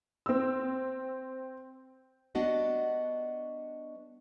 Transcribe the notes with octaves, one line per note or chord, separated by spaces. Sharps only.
C4 E6
G3 B3 D4 F#4 D#5 F#5